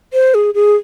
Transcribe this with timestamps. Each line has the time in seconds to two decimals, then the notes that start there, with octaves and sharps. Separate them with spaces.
0.13 C5
0.34 G#4
0.54 G#4